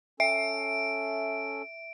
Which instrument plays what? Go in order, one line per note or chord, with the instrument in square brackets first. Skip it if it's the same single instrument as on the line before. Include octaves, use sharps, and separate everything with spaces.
[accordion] C#4 A4 [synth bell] E5 [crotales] D7